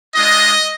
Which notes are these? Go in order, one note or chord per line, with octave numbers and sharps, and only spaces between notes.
G#3 D4 F4 D#5